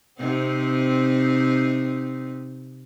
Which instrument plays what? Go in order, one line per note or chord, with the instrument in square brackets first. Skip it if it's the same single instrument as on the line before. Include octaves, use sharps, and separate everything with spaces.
[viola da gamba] C3 C4 D#4